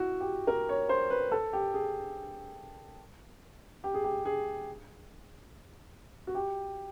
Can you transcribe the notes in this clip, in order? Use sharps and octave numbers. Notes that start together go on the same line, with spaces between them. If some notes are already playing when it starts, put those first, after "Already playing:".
Already playing: E4 F#4
G4
A#4
C#5
C5
B4
A4
G4
G#4
G4
G#4
G4
G#4
F#4
G4